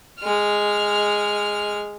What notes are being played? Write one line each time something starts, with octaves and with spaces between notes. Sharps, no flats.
G#3 F6